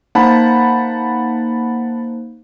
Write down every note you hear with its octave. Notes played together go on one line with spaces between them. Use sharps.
A#3 D#4 C5 F#5 A5 B5